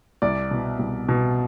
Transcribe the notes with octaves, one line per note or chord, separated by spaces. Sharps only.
C2 D5
B2
C2
B2